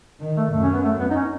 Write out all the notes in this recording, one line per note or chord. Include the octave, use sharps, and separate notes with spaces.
D#3
A3
F#2 A3
C#4
B3
A3
B3
D#4
C#4